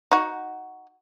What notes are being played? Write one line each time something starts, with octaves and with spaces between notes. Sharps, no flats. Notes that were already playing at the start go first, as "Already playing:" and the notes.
D#4 F#4